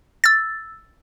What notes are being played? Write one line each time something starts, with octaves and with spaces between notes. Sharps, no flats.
E6 A6